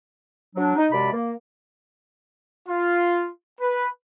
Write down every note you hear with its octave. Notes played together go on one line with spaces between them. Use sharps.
F#3 D4
D#4
F#2 C3 G#3 D5 B5
A#3
F4
B4